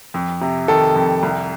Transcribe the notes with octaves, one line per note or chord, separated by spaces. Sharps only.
F2
C3
D#3 A4
F2
C2